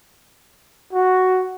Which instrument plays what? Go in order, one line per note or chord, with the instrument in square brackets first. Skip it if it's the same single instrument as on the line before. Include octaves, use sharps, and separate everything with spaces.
[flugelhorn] F#4